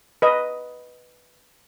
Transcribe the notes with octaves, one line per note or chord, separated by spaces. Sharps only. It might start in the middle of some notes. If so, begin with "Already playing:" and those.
B4 D#5